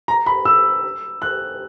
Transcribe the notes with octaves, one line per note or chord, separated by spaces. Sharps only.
A#5
B5
E6
F#6